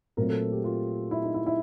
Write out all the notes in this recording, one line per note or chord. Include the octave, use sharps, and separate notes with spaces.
A#2 F#3 A3 C4 A#4
A4
G4
F4
E4
D#4
E4
E4